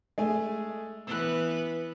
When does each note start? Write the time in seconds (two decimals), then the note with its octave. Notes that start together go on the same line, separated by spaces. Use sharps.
0.18 G#3 A3 G#5
1.07 E3 B3 B4 E6 F#6